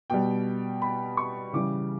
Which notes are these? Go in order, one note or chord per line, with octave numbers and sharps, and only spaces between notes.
B2 G3 G5
B5
C#6
C#3 E3 G3 D6